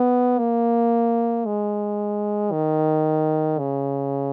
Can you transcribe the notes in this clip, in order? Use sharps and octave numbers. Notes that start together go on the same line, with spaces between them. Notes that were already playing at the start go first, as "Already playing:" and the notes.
Already playing: B3
A#3
G#3
D#3
C#3